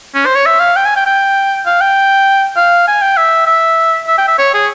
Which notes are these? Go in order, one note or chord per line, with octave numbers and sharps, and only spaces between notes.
C#4
C5
C#5
E5
F5
G5
G#5
G5
G5
F5
G5
F5
G#5
G5
E5
E5
E5
G5
E5
C#5
G#4